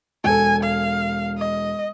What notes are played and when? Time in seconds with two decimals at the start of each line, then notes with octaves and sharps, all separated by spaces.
0.24 E1 A4 G#5
0.63 F5
1.38 D#5